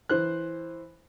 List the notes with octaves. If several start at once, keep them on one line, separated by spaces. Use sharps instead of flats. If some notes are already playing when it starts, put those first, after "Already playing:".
E3 C5 F#6